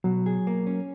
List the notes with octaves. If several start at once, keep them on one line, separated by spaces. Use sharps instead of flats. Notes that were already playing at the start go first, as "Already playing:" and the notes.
B2 F#3
G#4
A#3
C#4